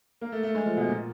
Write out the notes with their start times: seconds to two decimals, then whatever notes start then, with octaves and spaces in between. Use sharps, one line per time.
0.21 A#3
0.32 A3
0.43 A3
0.55 G#3
0.66 F3
0.77 B2
0.88 A#2